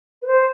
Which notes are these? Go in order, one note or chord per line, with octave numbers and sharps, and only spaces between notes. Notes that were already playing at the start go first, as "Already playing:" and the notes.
B4
C5